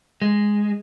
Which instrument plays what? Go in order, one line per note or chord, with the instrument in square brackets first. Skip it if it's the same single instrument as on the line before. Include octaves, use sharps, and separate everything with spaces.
[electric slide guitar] G#3